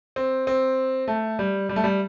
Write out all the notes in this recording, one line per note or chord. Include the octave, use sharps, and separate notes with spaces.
C4
C4
A3
G3
G3
A3
G3